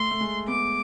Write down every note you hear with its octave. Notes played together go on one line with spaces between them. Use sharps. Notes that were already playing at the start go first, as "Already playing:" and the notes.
Already playing: A3 C6
A3
G#3
B3 D6